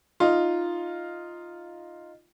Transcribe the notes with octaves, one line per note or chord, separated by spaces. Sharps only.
D#4 F4